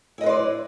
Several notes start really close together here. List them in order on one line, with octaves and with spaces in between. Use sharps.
E4 D#5 B4 C5 D5